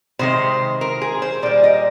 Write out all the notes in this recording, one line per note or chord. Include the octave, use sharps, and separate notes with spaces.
C3 D#3 G#3 C5
A#4
G#4
C5
A#2 G3 D5
D#5